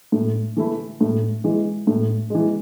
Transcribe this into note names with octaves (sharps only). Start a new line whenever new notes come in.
A2
E3 A3 E4
A2
E3 G#3
A2
E3 G#3